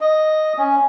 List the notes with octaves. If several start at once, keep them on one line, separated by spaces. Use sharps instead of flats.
D#5
C#4